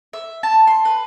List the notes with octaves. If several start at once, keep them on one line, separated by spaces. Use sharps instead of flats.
E5
A5
C6
B4